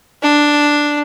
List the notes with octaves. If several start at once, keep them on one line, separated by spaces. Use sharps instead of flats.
D4